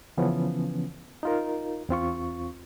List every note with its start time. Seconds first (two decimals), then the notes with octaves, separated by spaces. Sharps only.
0.17 C#3 E3 F3 B3 C#4
1.23 D#4 F4 A#4
1.89 E2 C4 F4 C#6